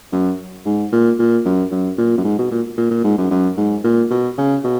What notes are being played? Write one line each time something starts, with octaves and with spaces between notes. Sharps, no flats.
F#2
G#2
A#2
A#2
F#2
F#2
A#2
F#2
G#2
B2
A#2
A#2
A#2
G#2
F#2
F#2
G#2
A#2
B2
C#3
B2